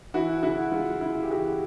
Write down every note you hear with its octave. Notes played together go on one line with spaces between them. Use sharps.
E3 E4 F#4
C#3 E4 F#4
G#3 F4
C#3 E4
G4
E3 F#4 G#4